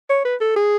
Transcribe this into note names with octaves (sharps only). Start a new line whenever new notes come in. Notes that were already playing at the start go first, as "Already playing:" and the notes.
C#5
B4
A4
G#4